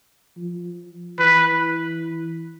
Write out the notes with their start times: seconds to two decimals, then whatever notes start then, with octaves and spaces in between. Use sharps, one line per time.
0.37 F3
1.19 E3 B4